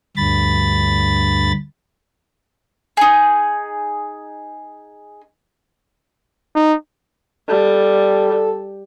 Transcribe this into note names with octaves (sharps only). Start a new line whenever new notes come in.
D2 G2 B5 A6
D#4 G#4
D#4
G3 A4